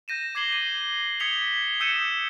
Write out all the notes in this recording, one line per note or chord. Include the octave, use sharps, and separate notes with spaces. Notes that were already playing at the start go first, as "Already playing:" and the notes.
G6 A#6 D#7 E7
D6 G#6 C7 F#7 G7
D#7
D#6 G#6 B6 C#7 F7 G7
D#6 E6 G6 C#7 D#7 E7